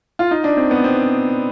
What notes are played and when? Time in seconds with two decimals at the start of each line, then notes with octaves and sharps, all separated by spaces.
0.19 F4
0.31 D#4
0.44 D4
0.57 C4
0.71 B3
0.84 C4